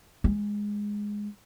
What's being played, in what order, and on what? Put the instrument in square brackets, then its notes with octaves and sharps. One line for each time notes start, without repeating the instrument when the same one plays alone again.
[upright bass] G#3